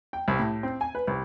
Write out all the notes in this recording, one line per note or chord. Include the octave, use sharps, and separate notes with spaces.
G5
C2
A2
C4
G#5
B4
C2